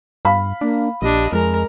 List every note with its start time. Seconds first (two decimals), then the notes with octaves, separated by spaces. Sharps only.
0.25 G2 F5 B5
0.61 A#3 D4
1.02 A#1 D4 G4 D#5
1.32 F2 G#3 A#4 A#5